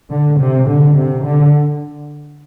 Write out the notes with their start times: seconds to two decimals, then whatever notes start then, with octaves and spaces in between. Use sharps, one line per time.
0.10 D3
0.39 C3
0.67 D3
0.96 C3
1.24 D3